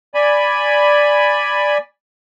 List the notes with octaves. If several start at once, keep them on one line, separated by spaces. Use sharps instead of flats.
D5 G#5 B5